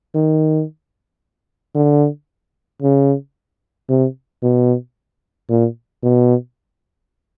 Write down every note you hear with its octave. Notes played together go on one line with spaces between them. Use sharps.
D#3
D3
C#3
C3
B2
A#2
B2